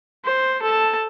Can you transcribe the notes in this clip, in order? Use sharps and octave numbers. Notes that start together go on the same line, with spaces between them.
C5
A4 A5